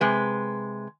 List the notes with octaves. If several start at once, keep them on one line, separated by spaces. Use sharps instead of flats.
C3 G#3 B4